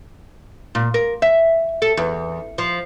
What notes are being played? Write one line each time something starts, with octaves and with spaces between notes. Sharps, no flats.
A#2
A#4
E5
A4
E2
F3